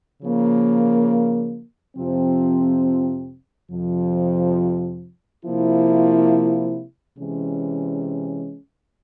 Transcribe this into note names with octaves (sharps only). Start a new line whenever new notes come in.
C#3 F3 A#3
F2 C3 F3 C4
F2 C3 F3
C3 F3 A#3 E4
C3 E3 G#3 C#4